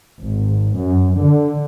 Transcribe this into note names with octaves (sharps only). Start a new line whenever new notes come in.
G#1
F#2
D3